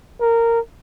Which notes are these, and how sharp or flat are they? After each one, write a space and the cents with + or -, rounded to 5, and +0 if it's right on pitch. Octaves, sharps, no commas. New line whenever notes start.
A#4 -15